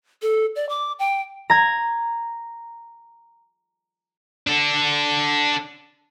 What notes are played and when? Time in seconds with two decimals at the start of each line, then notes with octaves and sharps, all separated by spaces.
0.22 A4
0.56 D5
0.69 D6
0.99 G5
1.50 A#5 G#6
4.47 D4 A4